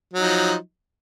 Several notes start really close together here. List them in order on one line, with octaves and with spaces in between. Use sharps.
F#3 D#4 F3